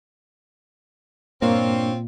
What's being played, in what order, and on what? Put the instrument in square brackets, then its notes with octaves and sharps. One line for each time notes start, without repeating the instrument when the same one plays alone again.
[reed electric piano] G2 A#3 [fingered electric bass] A#2 [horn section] C4 F4 [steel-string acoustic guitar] D4 C#5